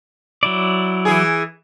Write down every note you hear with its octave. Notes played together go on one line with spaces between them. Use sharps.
F#3 E4 D5
E3 G#4